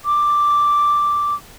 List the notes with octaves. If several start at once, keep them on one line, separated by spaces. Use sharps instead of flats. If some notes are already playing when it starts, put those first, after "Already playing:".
D6